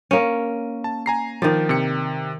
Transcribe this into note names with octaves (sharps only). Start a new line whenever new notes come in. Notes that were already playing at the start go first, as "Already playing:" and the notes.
A#3 C#4
A5
G#5 A#5 C7
D#3 F3 D5
C3 C#7